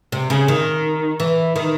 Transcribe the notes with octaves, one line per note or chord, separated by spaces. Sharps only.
C3
C#3
D#3
E3
D#3